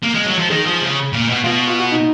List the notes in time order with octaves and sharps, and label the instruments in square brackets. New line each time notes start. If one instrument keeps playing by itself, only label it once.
[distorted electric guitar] A#3
G#3
F#3
F3
[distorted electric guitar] D#3 [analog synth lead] G#4
[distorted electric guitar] F3
C#3
A#2
B2
[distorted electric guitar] B2 [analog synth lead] F4
[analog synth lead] F4
F#4
D#4